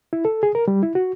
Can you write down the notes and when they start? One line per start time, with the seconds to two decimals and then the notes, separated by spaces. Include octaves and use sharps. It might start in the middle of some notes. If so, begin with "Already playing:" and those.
0.13 E4
0.25 A4
0.43 G#4
0.55 A#4
0.68 G3
0.83 E4
0.95 F#4